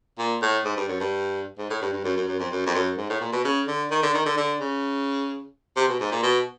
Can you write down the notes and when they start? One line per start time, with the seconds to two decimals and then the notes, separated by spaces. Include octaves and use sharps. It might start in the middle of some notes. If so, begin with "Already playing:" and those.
0.19 A#2
0.42 A2
0.65 G#2
0.77 G2
0.89 F#2
1.00 G2
1.58 G#2
1.70 A2
1.82 G2
1.93 G2
2.04 F#2
2.17 F#2
2.28 F#2
2.40 F2
2.51 F#2
2.67 F2
2.75 F#2
2.98 G#2
3.10 A2
3.21 A#2
3.33 B2
3.45 C#3
3.67 D3
3.91 D#3
4.03 D3
4.14 D#3
4.26 D3
4.37 D3
4.61 C#3
5.77 C3
5.89 B2
6.01 G#2
6.12 A#2
6.23 B2